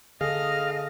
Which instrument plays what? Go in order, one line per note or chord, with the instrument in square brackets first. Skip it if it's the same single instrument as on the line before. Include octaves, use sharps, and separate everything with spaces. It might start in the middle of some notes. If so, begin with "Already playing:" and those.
[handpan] D3 A4 [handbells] G#4 [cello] D#5 [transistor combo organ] F5